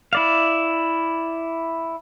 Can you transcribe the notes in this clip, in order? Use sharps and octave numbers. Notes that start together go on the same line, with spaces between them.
E4 D5 F5